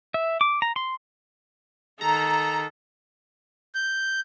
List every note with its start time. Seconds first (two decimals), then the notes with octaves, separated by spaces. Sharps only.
0.14 E5
0.41 D6
0.62 A#5
0.76 C6
2.01 D#3 A4 A#5
3.75 G6